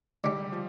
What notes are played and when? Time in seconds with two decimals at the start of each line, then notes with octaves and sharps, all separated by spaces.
0.24 D3 G3 G#3 D4 G4
0.52 F3